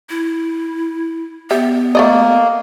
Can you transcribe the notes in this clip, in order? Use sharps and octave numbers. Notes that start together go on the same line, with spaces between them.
E4
B3 G4 E5
A3 A#3 D5 D#5